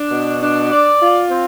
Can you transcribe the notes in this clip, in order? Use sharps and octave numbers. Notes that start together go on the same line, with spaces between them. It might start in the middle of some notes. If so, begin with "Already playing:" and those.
Already playing: D4
B2
D4
D5
F4
C4